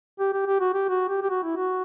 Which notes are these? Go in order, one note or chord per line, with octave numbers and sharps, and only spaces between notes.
G4
G4
G4
F#4
G4
F#4
G4
G4
F#4
E4
F#4